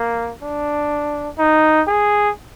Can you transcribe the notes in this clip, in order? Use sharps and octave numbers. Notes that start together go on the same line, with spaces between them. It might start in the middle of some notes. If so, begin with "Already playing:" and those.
Already playing: A#3
D4
D#4
G#4